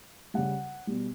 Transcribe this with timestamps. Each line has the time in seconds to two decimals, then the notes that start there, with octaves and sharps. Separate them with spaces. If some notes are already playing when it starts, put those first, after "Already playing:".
0.34 C#3 G3 F#5
0.87 B2 G3